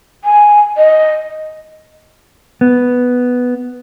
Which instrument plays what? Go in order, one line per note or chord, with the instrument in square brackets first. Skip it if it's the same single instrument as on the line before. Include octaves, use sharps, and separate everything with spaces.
[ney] G#5
D#5
[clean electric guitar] B3